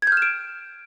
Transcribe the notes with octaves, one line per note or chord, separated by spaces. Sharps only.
F6 G6 G#6 D7 E7